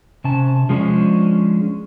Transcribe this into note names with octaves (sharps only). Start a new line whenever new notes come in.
C3 C#4 A5
F3 G#3 B3 C#4 D4